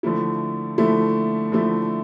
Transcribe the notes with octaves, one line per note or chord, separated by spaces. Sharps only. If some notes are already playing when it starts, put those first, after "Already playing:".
D3 F3 A3 E4
D3 F3 A3 E4
D3 F3 A3 E4